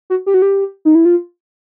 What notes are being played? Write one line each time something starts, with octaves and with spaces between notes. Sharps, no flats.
F#4
G4
F#4
G4
D#4
E4
F4